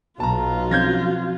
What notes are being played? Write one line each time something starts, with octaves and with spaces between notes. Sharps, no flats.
B1 F4 F#4 A5 A#5
F3 C4 C#4 G6 G#6 A#6